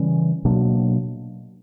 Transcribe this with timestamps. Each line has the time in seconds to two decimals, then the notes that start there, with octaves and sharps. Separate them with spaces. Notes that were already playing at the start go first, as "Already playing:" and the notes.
Already playing: C#3 E3 G3 C#4
0.45 B2 F#3 A#3 D4